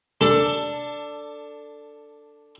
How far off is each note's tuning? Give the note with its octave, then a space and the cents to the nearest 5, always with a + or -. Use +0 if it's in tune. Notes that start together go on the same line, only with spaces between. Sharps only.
D4 +0 A4 +15